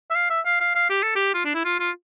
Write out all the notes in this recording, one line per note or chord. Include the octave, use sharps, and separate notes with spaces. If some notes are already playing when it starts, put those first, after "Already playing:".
E5
F5
E5
F5
F5
F5
G4
A4
G4
F4
D4
E4
F4
F4